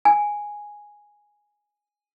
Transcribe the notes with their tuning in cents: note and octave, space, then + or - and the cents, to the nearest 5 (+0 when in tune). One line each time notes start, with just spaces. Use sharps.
G#5 -5